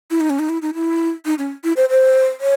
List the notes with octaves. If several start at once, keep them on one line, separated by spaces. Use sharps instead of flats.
E4
D#4
C#4
D#4
E4
D#4
E4
D#4
C#4
E4
C5
C5
C#5